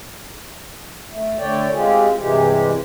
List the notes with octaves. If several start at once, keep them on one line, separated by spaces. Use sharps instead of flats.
A3
D3 A3 C#5 D5 G5
G#3 C4 F4 G4 G#4
G2 C3 E3 G#3 G4